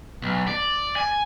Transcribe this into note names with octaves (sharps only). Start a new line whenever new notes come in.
B1
D5
G#5